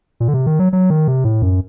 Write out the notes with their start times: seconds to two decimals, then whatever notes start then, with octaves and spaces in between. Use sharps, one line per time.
0.20 A#2
0.28 D3
0.34 C3
0.46 D#3
0.59 F#3
0.73 F#3
0.90 D#3
1.08 C3
1.24 A2
1.42 F#2